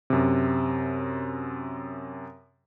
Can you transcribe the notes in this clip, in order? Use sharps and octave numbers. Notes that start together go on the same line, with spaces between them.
F#2 C3